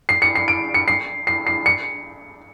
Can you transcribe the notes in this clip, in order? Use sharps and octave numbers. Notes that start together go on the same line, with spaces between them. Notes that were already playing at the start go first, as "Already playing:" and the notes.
C7
C#7
C7
D7
C#7
C7
C7
C7
C#7